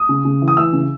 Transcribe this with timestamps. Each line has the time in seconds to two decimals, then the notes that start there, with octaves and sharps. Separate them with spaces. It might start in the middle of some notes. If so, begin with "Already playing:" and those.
Already playing: D#6
0.09 C#3
0.25 C#3
0.42 E3
0.48 D#6
0.57 E3 E6
0.73 C#3